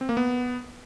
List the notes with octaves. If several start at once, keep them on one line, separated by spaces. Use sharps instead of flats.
C4
A#3
B3